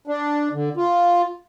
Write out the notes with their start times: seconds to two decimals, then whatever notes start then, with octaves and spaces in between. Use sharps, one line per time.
0.07 D4
0.53 D3
0.77 F4